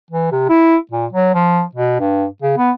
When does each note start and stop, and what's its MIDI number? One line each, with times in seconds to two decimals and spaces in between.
0.11 0.30 52
0.32 0.46 48
0.49 0.76 64
0.91 1.06 46
1.12 1.30 54
1.34 1.62 53
1.75 1.95 47
2.00 2.26 43
2.42 2.55 49
2.58 2.71 59